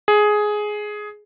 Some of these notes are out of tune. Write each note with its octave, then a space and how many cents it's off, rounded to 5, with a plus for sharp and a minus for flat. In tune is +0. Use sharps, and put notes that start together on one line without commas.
G#4 +10